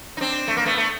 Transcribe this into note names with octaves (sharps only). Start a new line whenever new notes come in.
D#4
C4 D4
A3
A#3
A3 B3
A3